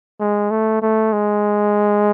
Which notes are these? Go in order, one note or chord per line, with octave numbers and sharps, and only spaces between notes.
G#3
A3
A3
G#3